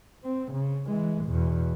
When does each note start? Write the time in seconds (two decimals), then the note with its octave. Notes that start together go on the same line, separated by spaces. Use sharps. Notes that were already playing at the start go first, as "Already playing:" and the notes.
0.24 C4
0.52 C#3
0.87 E3 G#3
1.25 E2 B2